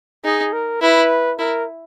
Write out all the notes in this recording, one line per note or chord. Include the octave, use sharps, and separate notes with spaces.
D#4 G#4
A#4
E4 B4
E4 A#4